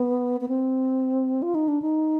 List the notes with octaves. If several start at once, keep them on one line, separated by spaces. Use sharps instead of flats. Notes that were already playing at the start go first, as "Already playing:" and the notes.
Already playing: B3
B3
C4
F4
D#4
D4
D#4